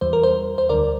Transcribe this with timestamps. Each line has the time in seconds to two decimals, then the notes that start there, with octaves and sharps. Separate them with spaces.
0.01 E2 E3 G3 C5
0.13 A#4
0.23 C5
0.58 C5
0.69 D2 D3 G3 A#4 D5